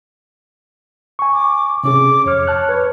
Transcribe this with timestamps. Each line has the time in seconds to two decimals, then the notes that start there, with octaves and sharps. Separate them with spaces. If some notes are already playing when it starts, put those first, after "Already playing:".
1.19 G#5 C#6
1.33 D6
1.83 C3 C#4 G#4 D6
2.26 F2 C#5 F6
2.47 A5 F6 F#6
2.69 B4